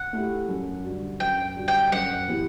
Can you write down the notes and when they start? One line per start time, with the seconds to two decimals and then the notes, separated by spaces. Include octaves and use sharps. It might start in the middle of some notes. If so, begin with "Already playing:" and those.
Already playing: F#5
0.13 A3 E4 G4
0.49 F#2
0.84 D3 G3 D4 F#4
1.20 F#2 G5
1.56 D3 G3 D4 F#4
1.68 G5
1.92 F#2 F#5
2.28 E3 B3 E4 G4